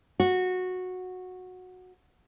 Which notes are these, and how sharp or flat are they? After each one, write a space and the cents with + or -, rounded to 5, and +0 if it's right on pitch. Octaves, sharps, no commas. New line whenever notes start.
F#4 -10